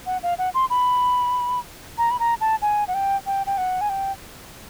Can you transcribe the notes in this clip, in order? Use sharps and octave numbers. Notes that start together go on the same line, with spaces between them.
F#5
F5
F#5
C6
B5
A#5
B5
A#5
A5
G#5
F#5
G5
G5
G5
F#5
G#5
G5